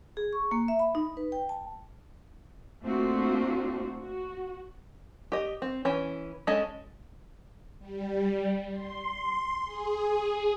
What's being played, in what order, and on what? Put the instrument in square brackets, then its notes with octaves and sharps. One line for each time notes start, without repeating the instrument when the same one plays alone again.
[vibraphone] G#4
C#6
A#3
E5
B5
D#4
B4
G5
A5
[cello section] A3 A#3 C4 D4 F4 F#4
F#4
[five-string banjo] G4 D#5
C4
E3 C#4
G#3 C#4 G#4 A4 D#5
[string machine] G3
C6
G#4